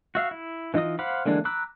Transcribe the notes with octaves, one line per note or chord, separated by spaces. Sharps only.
F#4 E5 F5
E4
E3 D#4 F4 D#5 D#6
C5 F5 F#5 B5 D6
D3 E3 G#3 A#3 D4
A#5 B5 D6 E6 F#6